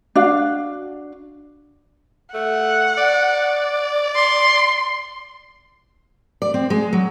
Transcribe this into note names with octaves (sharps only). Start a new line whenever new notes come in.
D4 F#4 F5
A3 F#5
D5
C6
D5
C4
G#3
F#3